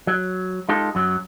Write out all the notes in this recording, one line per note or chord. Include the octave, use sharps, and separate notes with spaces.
F#3
G#3 D#4 F4 G4 A4
F#2 F#3